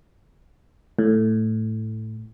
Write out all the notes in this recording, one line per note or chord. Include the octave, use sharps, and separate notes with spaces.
A2